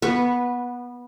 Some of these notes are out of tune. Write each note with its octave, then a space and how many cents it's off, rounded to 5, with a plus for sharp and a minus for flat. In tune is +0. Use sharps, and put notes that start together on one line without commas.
B3 -15 B4 +0 C#6 +0